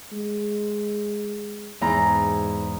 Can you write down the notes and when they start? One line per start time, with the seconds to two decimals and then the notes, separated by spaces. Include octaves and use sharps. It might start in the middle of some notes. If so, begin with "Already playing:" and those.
0.12 G#3
1.81 E2 G#2 A#5